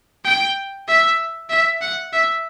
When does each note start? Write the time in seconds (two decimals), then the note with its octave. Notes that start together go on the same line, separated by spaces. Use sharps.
0.25 G5
0.88 E5
1.50 E5
1.81 F#5
2.13 E5